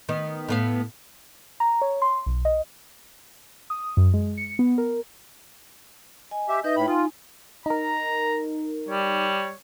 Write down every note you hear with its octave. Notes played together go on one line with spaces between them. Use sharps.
D#3 B3
A2 B3 F5
A#5
C#5
C6
B1
D#5
D#6
F#2
G#3
C#7
B3
A#4
D#5 G#5
G4 E5
D#4 B4 D#5 E5 G6
A2 G5 B5
D#4 F4 G#5
D#4 A#4 A#5
G3 C#5